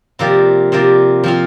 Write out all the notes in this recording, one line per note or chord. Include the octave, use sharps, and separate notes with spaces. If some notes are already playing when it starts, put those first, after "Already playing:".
C3 F3 A#3 G4 D5
C3 F3 A#3 G4 D5
F3 C4 F4